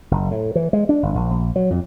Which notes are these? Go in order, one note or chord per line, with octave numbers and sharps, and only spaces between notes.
F#1
A2
E3
G#3
D4
G1
A#1
A#1
F#3
F2